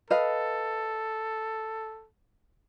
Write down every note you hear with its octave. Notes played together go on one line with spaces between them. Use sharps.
A4 B4 D#5 F5